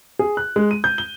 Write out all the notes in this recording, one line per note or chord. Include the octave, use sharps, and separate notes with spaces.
G#4
F#6
G#3
D#7
G6
G7